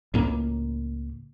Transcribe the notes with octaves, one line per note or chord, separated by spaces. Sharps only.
C#2 A2 A#3